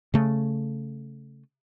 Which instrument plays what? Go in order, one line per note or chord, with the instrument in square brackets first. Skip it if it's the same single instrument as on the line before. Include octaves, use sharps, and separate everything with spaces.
[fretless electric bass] C#3 A3